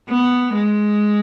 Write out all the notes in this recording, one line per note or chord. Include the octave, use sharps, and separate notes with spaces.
B3
G#3